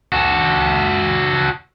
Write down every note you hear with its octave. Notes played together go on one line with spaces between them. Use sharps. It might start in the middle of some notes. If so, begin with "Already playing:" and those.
F#4 A4